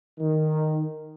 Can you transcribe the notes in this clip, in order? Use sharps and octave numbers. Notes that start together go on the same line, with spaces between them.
D#3